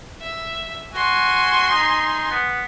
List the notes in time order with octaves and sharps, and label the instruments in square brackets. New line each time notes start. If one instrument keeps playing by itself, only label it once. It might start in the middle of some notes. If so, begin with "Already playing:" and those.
[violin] E5
[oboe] F#4 [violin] G#5 C6
[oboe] D#4
B3